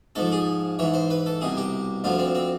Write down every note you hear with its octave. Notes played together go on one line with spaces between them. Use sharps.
G#2 F3 A4
G#4
G#2 E3 C#5
C5
B4
A4
C2 B2 G#4
G4
D2 D3 F3 F4
C4
C4